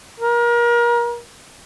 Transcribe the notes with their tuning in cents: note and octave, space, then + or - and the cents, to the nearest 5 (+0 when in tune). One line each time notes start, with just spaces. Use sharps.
A#4 +30